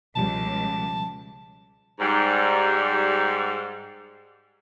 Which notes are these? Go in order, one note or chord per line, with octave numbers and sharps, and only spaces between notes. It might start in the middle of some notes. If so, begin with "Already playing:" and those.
C#2 B2 F3 G3 A5
G#2 G3